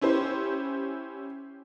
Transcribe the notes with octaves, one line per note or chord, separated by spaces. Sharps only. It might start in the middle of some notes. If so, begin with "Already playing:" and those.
C#4 E4 G4 C5